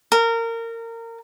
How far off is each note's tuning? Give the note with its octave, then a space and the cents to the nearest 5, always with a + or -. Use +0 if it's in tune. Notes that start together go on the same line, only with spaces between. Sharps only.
A#4 -25